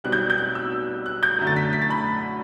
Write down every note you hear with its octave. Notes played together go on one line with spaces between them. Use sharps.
B1 B2 G3 C4 F#6
G6
G6
F#6
E6
F#6
G6
F#2 D3 A3
A6
B6
B6
A6
B5